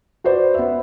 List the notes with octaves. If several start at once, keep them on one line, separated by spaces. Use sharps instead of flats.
F#4 B4 C5 D5
B3 E5